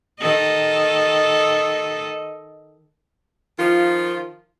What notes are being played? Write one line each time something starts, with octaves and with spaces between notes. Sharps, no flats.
D#3 A4 D#5
D#3 F3 F4